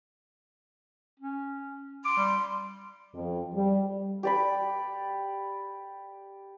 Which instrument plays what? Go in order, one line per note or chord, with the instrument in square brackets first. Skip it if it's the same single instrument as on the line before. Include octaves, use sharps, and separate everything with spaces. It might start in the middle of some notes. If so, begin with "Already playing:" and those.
[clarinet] C#4
[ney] C6 [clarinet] D6
[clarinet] G3
[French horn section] F2
G3
[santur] G4 D5 B5